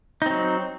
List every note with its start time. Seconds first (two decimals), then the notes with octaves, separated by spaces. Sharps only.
0.22 D#4
0.26 C4
0.30 F#3